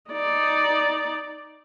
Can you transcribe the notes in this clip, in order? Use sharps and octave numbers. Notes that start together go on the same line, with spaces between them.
D#4 D5